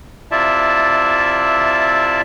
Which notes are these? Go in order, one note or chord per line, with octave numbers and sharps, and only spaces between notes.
C3 E4 F4 D5 E5 A5